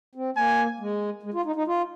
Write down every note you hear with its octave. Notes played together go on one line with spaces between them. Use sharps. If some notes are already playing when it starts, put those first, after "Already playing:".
C4
A#3 G#5
G#3
G#3
F4
D#4
D#4
F4